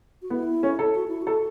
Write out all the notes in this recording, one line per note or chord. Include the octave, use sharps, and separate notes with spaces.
F#4
B3 E4
C#4
A4
F#4
E4
F#4 A4